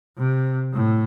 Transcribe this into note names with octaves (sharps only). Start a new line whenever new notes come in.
C3
A2